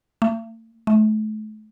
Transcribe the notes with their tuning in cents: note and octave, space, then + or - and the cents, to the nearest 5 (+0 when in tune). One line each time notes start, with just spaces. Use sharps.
A3 +45
A3 -35